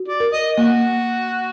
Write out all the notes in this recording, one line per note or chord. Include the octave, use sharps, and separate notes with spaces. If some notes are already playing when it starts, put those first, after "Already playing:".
Already playing: F#4
D5
A#4
D#5
A#3 F#4